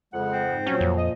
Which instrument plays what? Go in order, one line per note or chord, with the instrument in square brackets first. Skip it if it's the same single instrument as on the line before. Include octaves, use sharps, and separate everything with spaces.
[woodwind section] F2 C#3 F#5 [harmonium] G#3
[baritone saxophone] C4
[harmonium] G#2
[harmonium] A#2 F3 [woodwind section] F#3 [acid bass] C#4
[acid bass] F2
[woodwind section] D#5